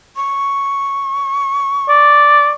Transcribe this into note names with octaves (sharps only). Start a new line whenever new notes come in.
C#6
D5